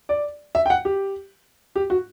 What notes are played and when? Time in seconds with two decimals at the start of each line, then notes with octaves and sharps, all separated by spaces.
0.09 D5
0.55 E5
0.66 G5
0.70 F#5
0.85 G4
1.76 G4
1.90 F#4